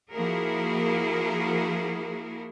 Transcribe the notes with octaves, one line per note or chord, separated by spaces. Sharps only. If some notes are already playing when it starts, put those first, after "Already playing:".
F3 A#3 E4 F#4 G#4 A#4